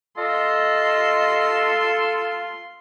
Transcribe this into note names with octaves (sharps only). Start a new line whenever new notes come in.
F4 A4 D#5 C6